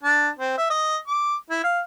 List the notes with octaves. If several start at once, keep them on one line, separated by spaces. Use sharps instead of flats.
D4
C4
E5
D#5
D6
E4
F5